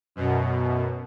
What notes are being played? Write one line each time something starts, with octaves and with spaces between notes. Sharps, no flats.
F#2 B2